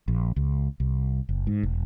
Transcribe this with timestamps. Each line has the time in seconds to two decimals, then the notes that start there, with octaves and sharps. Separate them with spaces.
0.08 A#1
0.36 C#2
0.80 C2
1.29 F#1
1.47 G#2
1.63 E1